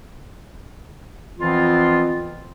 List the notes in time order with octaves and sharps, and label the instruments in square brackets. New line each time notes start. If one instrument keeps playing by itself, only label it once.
[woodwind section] F2 E3 F3 B3 C4 F4